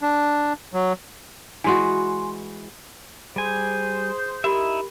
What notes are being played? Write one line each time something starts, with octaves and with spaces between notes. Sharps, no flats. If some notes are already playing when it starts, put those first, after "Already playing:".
D4
F#3
E3 G#3 F#4 G#5 C6
G3 G#4 C5 G#5
D#4 E4 G4 A#4 E5 B5